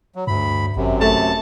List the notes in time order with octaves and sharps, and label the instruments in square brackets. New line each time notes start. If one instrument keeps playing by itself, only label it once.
[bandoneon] F#3
[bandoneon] D2 B5 [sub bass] G2
[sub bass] G#1 [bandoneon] F#2 C3
[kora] A3 [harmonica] A5